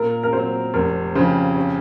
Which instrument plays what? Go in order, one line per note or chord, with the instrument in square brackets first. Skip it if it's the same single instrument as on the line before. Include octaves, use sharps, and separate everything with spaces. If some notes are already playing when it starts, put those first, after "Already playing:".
Already playing: [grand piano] A#2 [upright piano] A#4
[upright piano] A#4
[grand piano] F#3 C4 [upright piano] C5
[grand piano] F1 [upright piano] A#4
[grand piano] F2 C#3 [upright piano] C5
[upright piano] C#5